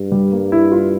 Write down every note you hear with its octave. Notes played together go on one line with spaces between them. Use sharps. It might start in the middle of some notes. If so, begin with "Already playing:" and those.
Already playing: G2
G3
A#3
E4
F4